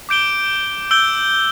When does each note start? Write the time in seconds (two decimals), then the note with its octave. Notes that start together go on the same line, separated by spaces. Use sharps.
0.09 D6 G6 D7 G7
0.91 E6 G6 D7 G7